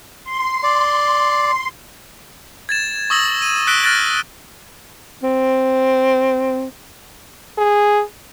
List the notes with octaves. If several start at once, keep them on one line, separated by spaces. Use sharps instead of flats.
C6
D5
G#6 A6 E7
C#6 D#6 E6 A#6 F#7
D#7
E6 F#6 A#6 B6 D7 G7
F6 F#6 A6 A#6 D7
C4
G#4